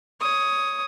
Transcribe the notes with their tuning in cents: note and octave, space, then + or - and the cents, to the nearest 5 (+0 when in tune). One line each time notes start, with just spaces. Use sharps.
C#5 +0 D#6 +10